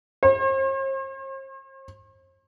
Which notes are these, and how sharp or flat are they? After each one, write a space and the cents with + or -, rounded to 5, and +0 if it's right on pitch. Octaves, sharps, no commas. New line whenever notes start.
C5 +45